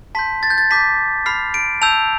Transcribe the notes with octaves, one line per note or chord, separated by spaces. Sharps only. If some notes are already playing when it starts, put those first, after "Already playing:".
A5 C6 G6 B6
A6
G6
A6
A5 D6 G6 B6
B5 F6 C7
D7
A5 E6 G6 F7